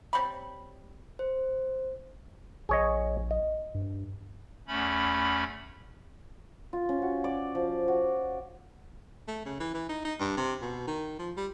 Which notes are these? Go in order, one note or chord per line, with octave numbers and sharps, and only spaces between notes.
G3 C4 C#5 B5
C5
A#1 G#4 C#5 D#5
D#5
G2
E2 A3 C#4 B5
F4
C#4
F#4
D5
F3
F#4
A3
C#3
E3
E3
D#4
D#4
G2
C3
B2
D#3
F3
G3